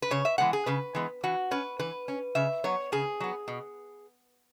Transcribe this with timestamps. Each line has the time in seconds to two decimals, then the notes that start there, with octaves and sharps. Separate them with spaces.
0.02 B4
0.11 C#3 C#5
0.25 E5
0.38 E3 G#3 B3 F#5
0.53 G#4
0.66 C#3 B4
0.95 E3 G#3 B3
1.23 E3 F#4
1.51 C#4 B4
1.79 E3 B4
2.08 C#4
2.35 C#3 E5
2.64 F#3 B3 C#5
2.92 C#3 G#4
3.20 F#3 B3
3.48 B2